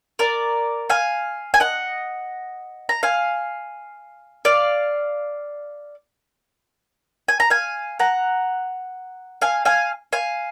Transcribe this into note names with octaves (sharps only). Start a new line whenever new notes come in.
A#4 D5
F5 G#5
G#5
D#5 F#5
A#5
F5 G#5
D5 F5
G#5
A#5
F5 G#5
F#5 A#5
F5 G#5
F5 G#5
F5 G#5